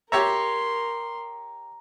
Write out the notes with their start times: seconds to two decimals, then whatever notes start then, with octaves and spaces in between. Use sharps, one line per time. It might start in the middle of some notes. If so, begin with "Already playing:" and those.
0.12 G4 A#4 C#5 E5 A#5 C6